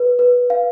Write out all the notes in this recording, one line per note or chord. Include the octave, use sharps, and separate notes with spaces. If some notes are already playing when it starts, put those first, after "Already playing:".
Already playing: B4
B4
F5